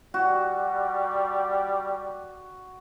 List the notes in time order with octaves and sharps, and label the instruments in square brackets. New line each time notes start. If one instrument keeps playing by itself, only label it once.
[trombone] G3 [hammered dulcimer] F#4